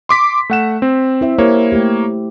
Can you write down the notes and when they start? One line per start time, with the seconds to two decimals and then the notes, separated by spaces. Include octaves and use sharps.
0.09 C6 D6 B6
0.50 A3 F#5 E7
0.82 C4
1.21 E4 C5 E5
1.38 A#3 E4 G4 C5 C#5
1.72 A3 G4